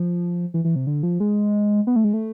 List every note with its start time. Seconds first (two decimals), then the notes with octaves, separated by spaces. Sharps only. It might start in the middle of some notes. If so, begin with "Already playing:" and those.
Already playing: F3
0.54 E3
0.64 E3
0.76 C3
0.87 D3
1.03 F3
1.20 G#3
1.87 B3
1.96 A3
2.04 G#3
2.13 A3